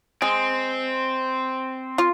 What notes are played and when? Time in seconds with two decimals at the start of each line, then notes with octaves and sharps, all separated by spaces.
0.22 G#3 C4
1.98 F4